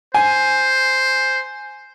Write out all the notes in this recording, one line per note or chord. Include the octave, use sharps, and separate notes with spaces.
C5 G#5